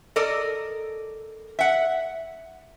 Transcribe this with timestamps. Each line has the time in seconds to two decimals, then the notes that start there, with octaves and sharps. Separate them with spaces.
0.16 A4 A#4 D5 D#5
1.59 E5 F#5